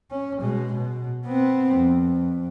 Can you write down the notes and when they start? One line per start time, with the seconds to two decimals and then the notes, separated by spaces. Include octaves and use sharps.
0.11 C#4
0.41 B2 G#3
0.74 B2
1.26 B3 C4
1.76 F2